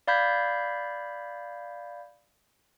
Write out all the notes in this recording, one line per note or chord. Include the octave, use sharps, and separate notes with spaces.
D5 F5 B5 G6 G#6 B6